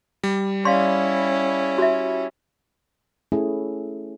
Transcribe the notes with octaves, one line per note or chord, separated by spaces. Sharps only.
G3
C#4 E4 D5 F5 C6
F#4 E5
A3 C#4 E4 G#4